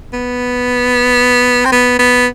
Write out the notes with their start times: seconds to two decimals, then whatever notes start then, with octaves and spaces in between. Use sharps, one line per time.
0.13 B3
1.65 C4
1.72 B3
1.99 B3